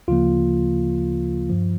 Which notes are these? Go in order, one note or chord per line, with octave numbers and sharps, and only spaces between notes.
D2 C#3 F3 A#3 F4
G2 F3